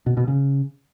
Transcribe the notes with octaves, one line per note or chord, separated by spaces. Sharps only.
B2
B2
C#3